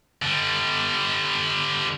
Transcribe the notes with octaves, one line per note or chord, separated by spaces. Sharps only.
D3 G3